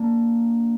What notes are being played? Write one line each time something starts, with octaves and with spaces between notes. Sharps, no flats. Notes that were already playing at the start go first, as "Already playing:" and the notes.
Already playing: A#3 D4